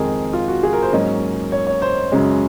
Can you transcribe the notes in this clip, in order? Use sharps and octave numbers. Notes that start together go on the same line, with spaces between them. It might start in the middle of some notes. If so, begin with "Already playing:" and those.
Already playing: F2 D#3 G#3 C4 G#4 A#4
F4
F#4
G#4
A#4
C5
G#2 F#3 A#3 C#4 D#5
C#5
C#5
C5
F#2 C#3 G#3 C#4